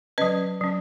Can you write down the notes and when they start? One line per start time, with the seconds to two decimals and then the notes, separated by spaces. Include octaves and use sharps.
0.18 F#3 C#4 B4 D#5
0.61 F#3 C#4